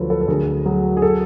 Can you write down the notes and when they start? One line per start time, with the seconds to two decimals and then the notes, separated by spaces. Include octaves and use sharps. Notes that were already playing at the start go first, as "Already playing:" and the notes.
Already playing: D2 F3 F#3 A4 B4 C#5
0.10 A4 B4
0.21 A4
0.28 D2 G#4 A#4
0.66 F#3 G#4
0.97 G#4
1.02 A4